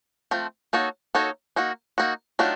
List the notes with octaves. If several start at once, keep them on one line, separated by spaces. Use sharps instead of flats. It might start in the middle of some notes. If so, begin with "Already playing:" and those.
F3 A3 C4
A#3 D#4 F#4 A4 C#5
A#3 D#4 F#4 A4 C#5
A#3 D#4 F#4
A#3 D#4 F#4
D#3 F#3 A3 D4 F4